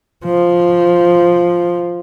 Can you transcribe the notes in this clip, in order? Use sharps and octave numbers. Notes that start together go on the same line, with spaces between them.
F3